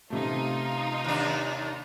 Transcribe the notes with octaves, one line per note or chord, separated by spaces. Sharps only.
A1 C3 A3 D#4 F4
D#2 D4